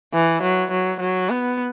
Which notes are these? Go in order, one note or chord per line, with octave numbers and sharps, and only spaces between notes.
E3
F#3
F#3
F#3
B3